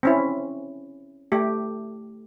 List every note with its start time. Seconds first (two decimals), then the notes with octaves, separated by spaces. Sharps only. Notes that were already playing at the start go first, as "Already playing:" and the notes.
0.03 C4 C#4 E4
1.32 A3 G4